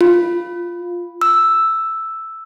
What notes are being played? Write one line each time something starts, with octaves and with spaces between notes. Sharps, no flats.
F4
E6